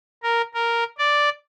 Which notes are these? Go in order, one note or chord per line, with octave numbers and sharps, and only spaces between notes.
A#4
A#4
D5